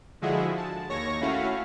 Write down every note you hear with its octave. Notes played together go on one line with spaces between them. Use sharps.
D3 F3 G#3 E4 F#4 G#4
A5
D#2 C#5 C#6 A#6
A3 C#4 E4 F#4 F5